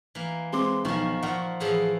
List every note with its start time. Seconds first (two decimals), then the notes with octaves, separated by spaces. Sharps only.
0.15 E3 A#3
0.53 G#3 C4 C6 D6
0.85 B1 D#3 F3 C#6
1.23 A#2 F3 F#5
1.60 A2 E3 F3 G#4